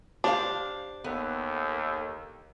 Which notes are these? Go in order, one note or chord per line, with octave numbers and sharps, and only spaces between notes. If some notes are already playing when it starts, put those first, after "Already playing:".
D4 G4 C5 F5
D#2 B3 A4